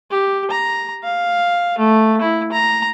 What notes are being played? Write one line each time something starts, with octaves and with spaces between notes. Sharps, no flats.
G4
A#5
F5
A3
E4
A#5